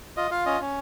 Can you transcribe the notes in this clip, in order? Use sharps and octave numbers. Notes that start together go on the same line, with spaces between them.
F4 D#5
F4 F5
C#4 D#5
C#4